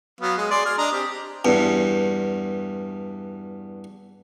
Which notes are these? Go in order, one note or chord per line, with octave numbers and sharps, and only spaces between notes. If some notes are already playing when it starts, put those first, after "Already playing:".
F#3 B3 F5
G#3
G#4 D5 C6
G#4 G#5 F6
D4 D#5 A#5
C4 G4
E2 G2